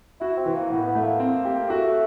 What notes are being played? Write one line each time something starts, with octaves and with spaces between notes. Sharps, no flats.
E4 F#4
C4
E3
A#3
A2 B3
B3
A3
A#3
C4
G4
A3 F#4